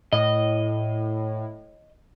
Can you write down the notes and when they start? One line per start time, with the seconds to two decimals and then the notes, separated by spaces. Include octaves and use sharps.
0.13 A2 D#5